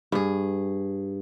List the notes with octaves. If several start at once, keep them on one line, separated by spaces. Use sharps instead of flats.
G2 G#4